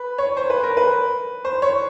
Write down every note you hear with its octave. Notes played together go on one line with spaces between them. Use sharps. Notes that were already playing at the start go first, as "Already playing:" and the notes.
Already playing: B4
C#5
C5
B4
A#4
B4
C5
C#5